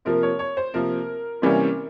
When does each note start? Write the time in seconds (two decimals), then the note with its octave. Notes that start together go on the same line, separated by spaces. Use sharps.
0.05 C3 F3 A#3 A#4
0.23 C#5
0.39 C#5
0.57 C5
0.74 C3 F3 A#3 A#4
1.42 C3 E3 G3 A#3 C#4